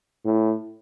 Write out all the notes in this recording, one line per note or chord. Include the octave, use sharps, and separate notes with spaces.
A2